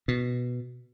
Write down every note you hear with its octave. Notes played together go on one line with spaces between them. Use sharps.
B2